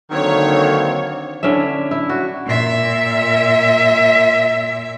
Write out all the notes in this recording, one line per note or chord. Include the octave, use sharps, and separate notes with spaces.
D3 D#3 F#3 A#3 C4 C#5
D3 C#4 E4 E5
E4
F#4
A#2 E5